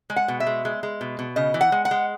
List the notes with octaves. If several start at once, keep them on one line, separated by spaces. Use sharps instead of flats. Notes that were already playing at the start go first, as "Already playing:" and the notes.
G#3
F#5
B2
E5
G#3
G#3
G#3
B2
B2
C#3 D#5
E3
F#5
G#3
F#5
G#3